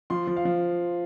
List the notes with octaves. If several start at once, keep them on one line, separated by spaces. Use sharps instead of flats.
F3 C6
F3
F5
F3